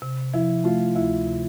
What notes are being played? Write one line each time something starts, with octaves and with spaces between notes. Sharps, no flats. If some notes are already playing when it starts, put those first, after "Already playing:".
C3
F3 E4
A3 F4
D2 E4
C3